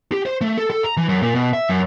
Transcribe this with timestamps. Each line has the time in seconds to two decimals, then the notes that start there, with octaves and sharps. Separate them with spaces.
0.12 G4
0.26 C5
0.41 A3
0.57 A4
0.70 A4
0.84 A#5
0.97 E3
1.09 F#2
1.22 A#2
1.35 B2
1.53 E5
1.69 F#2